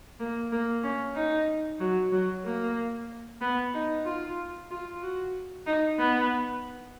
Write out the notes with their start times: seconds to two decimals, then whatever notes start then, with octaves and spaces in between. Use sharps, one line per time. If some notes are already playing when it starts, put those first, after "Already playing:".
0.20 A#3
0.52 A#3
0.83 C#4
1.16 D#4
1.80 F#3
2.12 F#3
2.45 A#3
3.41 B3
3.74 D#4
4.05 F4
4.71 F4
5.02 F#4
5.66 D#4
5.99 B3